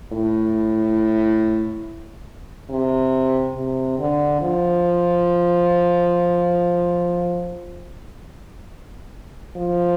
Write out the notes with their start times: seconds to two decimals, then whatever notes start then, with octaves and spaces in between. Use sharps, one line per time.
0.12 A2
2.70 C3
3.56 C3
3.99 D3
4.41 F3
9.56 F3